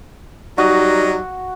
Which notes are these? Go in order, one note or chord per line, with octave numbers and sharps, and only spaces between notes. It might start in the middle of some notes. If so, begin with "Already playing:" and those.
F#3 G3 D#4 F#4